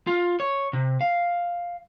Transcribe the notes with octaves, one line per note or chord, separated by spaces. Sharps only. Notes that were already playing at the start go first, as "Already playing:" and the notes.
F4
C#5
C3
F5